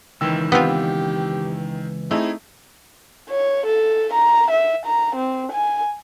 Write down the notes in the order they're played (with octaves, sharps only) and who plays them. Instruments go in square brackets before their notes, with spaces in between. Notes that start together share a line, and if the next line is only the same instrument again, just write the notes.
[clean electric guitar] C#2 E3 [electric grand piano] D#3 G5 E6
[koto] B3 C4 F4 [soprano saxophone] G4
[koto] A3 [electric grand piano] C4 E4 G#4 [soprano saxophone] D#4
[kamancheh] C#5
A4
A#5
E5
A#5
C4
G#5